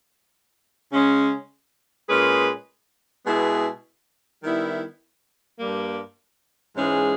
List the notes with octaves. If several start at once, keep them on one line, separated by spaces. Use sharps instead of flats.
C#3 G#3 C#4
A#2 G#3 C#4 G#4 B4
B2 G#3 B3 E4 G#4
D#3 G3 B3 E4
G2 G3 A#3
G#2 E3 G#3 C#4 G#4